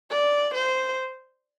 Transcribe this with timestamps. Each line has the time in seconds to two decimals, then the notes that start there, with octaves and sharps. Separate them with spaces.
0.11 D5
0.54 C5